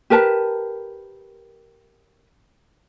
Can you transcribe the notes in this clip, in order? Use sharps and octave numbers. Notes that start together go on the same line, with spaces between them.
G4 A#4 B4 A5